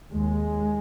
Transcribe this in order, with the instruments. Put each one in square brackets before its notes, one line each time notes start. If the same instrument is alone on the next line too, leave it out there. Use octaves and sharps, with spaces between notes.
[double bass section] D#2 G#3